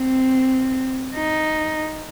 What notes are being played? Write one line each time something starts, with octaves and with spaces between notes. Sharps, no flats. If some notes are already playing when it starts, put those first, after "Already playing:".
Already playing: C4
D#4